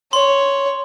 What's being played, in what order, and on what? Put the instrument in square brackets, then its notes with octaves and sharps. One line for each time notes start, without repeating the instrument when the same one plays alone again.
[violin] C#5 [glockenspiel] C6